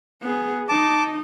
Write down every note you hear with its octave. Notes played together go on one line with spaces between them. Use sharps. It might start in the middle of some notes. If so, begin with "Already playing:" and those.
B3 G#4
D#4 D#5 A5 D6